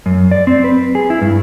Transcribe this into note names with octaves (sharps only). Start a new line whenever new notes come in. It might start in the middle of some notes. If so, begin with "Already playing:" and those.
F#2
D5
C4
B4
G#4
E4
G2